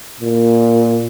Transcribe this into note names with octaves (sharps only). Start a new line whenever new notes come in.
A#2